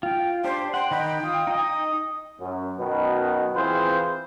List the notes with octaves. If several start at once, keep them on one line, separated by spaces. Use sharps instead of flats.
F4 G5
D4 G4 C5 C6
F#5 G5 C6
D#3 D#5 G5 B5 F#6
F4 D#6
D#4 D#5
F#2
F#2 B2 D#3 B3 B4
E3 C4 F4 G#4 B4 C5